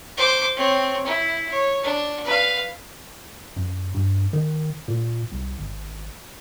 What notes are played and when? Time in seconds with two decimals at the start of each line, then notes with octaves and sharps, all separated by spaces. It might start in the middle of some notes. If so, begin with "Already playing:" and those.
0.17 C5 D6
0.56 C4 C#5
1.05 E4
1.51 C#5
1.83 D4
2.25 B4 F5
3.56 F#2
3.94 G2
4.33 D#3
4.88 A#2
5.32 C2
5.59 G#1